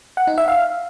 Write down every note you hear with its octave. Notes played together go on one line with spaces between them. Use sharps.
F#5
D#4
E5
F5